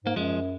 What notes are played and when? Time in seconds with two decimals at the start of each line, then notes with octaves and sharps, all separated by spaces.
0.04 G#2 A#3
0.16 F#2 F3 G#3